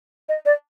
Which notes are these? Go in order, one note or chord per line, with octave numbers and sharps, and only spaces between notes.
D#5
D5